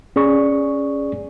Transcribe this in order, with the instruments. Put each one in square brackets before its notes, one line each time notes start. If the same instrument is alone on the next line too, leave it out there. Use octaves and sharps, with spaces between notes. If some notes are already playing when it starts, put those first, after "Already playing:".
[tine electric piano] C#4 G#4 D5 C#6